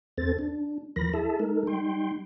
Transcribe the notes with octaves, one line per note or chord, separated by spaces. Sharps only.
E2 C4 A4 C5 A6
D4
D#2 E3 F3 A#4 B5 A#6
E4 G#4 A4 E5 A5
G#3 D#4 A4 A#4
G3 D#4 G5 C6